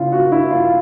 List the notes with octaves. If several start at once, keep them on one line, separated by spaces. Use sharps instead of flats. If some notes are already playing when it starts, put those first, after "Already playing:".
Already playing: C#3 E4 F4
F#4
E4
F4